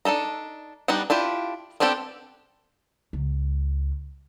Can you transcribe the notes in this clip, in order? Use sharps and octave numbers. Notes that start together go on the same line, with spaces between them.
D4 D#4 A4 A#5
G3 B3 D4 D#4 F#5
D4 E4 F4 G4
B3 C4 D4 G4 A4
C#2